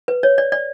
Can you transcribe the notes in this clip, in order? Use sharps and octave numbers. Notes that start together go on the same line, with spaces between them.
B4
C#5
D5
D5